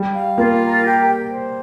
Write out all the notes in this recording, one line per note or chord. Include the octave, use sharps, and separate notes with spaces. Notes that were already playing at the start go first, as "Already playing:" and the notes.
Already playing: G3
F5
A#3 F4
A#4
G4
G5
C5